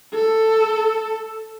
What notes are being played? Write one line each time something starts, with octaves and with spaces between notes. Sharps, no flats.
A4